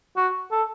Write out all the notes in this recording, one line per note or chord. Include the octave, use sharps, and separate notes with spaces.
F#4
A4